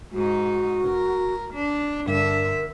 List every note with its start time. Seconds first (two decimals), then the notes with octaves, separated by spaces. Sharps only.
0.13 G#2 D#4 F#4
0.84 E1 A#4
1.54 D4
2.08 G2 D3 A#4 E5